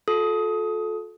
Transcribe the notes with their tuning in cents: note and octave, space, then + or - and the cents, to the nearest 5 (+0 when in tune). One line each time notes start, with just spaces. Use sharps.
F4 +35 A4 -20 D#6 +20